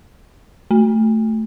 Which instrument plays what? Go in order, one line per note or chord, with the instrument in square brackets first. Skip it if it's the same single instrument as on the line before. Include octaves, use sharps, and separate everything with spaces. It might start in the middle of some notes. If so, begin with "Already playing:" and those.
[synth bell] A3